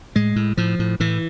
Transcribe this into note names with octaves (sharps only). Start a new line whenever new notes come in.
A2 G#3
A2
A2 F3
A2
A2 E3